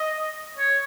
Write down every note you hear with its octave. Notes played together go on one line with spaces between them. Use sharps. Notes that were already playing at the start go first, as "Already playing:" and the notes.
Already playing: D#5
C#5